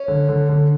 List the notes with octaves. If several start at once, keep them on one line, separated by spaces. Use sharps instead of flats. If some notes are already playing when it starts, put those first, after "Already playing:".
Already playing: C#4
D3
D3
D3